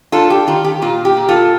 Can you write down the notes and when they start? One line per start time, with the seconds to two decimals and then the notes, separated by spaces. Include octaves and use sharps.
0.12 D4 F4 A4
0.30 G4
0.47 D#3 F4
0.64 G4
0.82 A#2 F4
1.05 G4
1.17 A#2
1.29 F4 A4